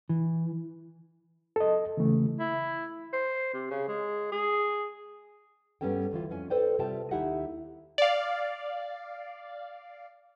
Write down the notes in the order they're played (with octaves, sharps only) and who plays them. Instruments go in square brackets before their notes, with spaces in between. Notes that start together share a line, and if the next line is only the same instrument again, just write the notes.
[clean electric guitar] E3
[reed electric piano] A4 D#5
C#3 E3 A3
[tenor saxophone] E4
C5
C3
C#3
G#3
G#4
[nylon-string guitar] G2 G3 B3 C#4 A4 G5
D2 E3 F4
F2 C#4 G#5
A4 B4 C5 D5 G5
C3 G3 F4 E5 G5 A5
D#2 D#4 E4 G4 E5 F#5
[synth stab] D5 F5